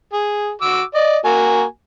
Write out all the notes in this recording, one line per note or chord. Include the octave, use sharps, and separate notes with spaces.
G#4
F#4 D6 E6
D5 D#5
A#3 F#4 G#5